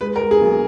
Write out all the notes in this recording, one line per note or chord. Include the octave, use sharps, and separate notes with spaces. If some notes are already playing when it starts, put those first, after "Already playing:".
G#3 B4
A#4
G#3
G#4
B1